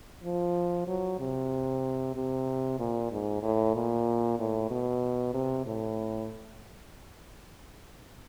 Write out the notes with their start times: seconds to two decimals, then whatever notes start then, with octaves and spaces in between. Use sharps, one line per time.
0.24 F3
0.88 F#3
1.20 C3
2.16 C3
2.79 A#2
3.12 G#2
3.43 A2
3.75 A#2
4.39 A2
4.71 B2
5.34 C3
5.66 A2